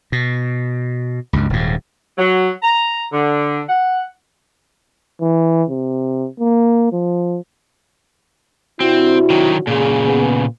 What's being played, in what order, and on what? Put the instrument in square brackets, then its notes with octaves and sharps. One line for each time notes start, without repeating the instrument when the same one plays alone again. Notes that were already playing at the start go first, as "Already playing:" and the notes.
[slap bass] B2
C#2 G2
D#1 G#2
[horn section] F#3
A#5
D3
F#5
[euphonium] E3
C3
A#3
F3
[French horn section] C3 D4 F#4 [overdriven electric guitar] C4 [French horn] E4
[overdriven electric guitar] D#3 F#3
[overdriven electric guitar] A#2 C#3 [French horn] G#4
[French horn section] B3